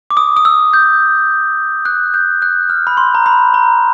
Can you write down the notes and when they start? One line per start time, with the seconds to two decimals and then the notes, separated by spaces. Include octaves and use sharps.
0.11 D6
0.17 D#6
0.37 D#6
0.45 E6
0.73 G6
1.85 F#6
2.14 G6
2.42 F#6
2.69 F6
2.87 B5
2.97 C6
3.15 A#5
3.26 B5
3.54 A#5